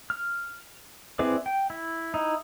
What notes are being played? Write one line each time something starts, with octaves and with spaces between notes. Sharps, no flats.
F6
C4 E4 G#4 B4 D5
G5
E4
D#4 E4